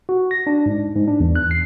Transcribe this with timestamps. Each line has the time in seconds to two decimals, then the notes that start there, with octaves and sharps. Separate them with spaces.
0.09 F#4
0.31 A#6
0.47 D4
0.66 G#2
0.96 G#2
1.08 D4
1.20 E2
1.36 F#6
1.51 C7